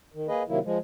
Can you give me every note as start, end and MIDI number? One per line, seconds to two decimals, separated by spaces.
0.14 0.27 51
0.28 0.43 58
0.28 0.43 68
0.28 0.43 71
0.28 0.43 75
0.48 0.59 48
0.48 0.59 51
0.48 0.59 54
0.48 0.59 58
0.48 0.59 64
0.65 0.78 53
0.65 0.78 56